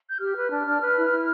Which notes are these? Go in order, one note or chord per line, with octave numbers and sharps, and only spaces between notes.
G6
G4 F6
B4
D4
D4
B4
E4
E4